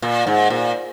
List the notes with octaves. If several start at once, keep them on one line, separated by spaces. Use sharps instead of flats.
A#2
G#2
A#2